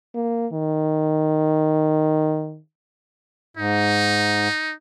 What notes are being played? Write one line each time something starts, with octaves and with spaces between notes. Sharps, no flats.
A#3
D#3
G#2 D#4